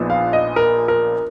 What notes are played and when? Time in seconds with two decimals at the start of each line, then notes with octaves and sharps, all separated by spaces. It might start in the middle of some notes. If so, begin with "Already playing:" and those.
Already playing: A#1 A#2 F3 B3 D#4
0.10 F5
0.33 D#5
0.56 A#4
0.88 A#4